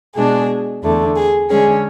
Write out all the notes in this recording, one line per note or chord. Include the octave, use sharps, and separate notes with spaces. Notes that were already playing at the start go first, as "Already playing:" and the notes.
B2 G#3 D4 G#4
E2 D3 A3
G#4
D3 G#3 C#4 G#4